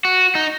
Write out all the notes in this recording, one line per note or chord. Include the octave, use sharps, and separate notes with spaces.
F#4
D#4